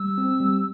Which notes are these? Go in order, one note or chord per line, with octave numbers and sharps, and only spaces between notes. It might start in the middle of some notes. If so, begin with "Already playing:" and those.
Already playing: G3 E6
C4
G3